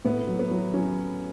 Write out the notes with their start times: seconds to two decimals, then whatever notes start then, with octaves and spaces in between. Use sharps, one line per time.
0.05 A2 B3
0.27 F#3
0.39 B3
0.51 F#3
0.74 F#3 C#4